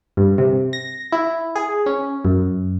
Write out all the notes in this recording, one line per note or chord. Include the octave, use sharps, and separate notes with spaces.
G2
C3
A#6
E4
G#4
C#4
F#2